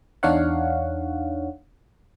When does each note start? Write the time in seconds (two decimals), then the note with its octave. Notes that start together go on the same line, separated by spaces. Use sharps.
0.23 E2 D4 D#4 C#5 F5 F#5